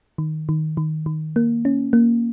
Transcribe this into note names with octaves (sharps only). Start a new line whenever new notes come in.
D#3
D#3
D#3
D#3
A#3
C#4
A#3